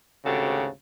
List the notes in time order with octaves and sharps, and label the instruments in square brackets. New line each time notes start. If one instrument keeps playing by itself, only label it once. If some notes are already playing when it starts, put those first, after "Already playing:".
[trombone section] G#1 D2 C#3 [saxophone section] F#4 G4 A4